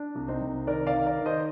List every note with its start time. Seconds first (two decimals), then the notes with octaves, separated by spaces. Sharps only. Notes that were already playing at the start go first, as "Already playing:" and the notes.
Already playing: D4
0.15 C2
0.28 C4 D#4
0.41 C2
0.67 D#3 A#4 D5
0.87 D5 F5
0.93 D#3
1.06 A#4 D5
1.19 D#3
1.26 C5 D#5